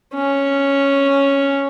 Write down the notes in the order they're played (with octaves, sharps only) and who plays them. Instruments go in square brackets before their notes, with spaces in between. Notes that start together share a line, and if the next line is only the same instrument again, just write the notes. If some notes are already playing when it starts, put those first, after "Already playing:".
[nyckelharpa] C#4